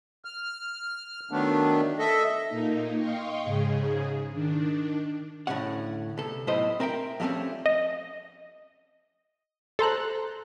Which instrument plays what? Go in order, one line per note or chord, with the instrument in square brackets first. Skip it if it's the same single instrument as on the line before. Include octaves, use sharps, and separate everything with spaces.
[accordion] F6
D#3 F#3 A3 B3 D4
A4 D#5 E5
[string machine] A#2 A#3 D#4
D#5 F5 G5 C6 C#6
G#2 C#3 G#4
D#3 D4
[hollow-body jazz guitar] D2 A2 C3 C#4 C#5 F#5
C2 A4
B1 A2 G3 E4 C5 D#5
C4 A#4 E5 G5
F3 G3 A3 A#3 C4 C#4
[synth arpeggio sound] D#5
A4 C5 A#5 F#6